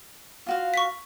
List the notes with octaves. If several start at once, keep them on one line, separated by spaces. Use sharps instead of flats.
F4 F#4 F5
C#6 B6